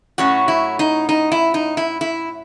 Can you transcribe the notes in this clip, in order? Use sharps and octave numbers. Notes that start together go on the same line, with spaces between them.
A2 F#3 C#4 F#4
E4
D#4
D#4
E4
D#4
E4
E4